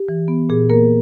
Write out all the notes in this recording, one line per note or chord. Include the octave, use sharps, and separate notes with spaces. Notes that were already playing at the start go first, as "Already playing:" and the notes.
Already playing: G4
E3
B3
A#2 G#4
A#3 A#4